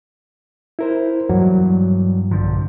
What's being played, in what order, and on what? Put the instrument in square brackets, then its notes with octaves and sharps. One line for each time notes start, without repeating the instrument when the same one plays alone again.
[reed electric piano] E4 A#4 C5
[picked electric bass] G2 E3 [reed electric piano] F#3
[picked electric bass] A#1 D3 F3